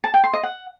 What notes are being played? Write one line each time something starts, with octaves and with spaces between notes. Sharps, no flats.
A5
G5
C6
D#5
F#5